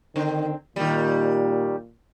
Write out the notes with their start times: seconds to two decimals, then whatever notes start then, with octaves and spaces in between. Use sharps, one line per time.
0.16 D3 D#3 C4
0.76 A#2 D#3 G3